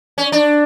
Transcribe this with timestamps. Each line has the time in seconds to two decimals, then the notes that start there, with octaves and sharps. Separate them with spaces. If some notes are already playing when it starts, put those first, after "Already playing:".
0.18 C#4
0.32 D4